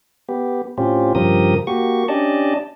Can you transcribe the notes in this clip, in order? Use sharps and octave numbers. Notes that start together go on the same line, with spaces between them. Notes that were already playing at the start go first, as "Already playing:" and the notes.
B3 G4
A2 C4 C#4 F4 G4
G2 C#3 F3 G4 A#4 D#6
A#3 F#4 G4 C#6
C#4 D4 G4 D5 D#5 A5